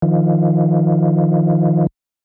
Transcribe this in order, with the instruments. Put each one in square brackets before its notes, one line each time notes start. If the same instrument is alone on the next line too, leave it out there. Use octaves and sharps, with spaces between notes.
[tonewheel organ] D#3 F3